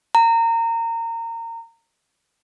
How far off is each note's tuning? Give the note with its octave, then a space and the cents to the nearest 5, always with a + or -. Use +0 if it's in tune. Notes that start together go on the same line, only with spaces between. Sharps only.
A#5 -25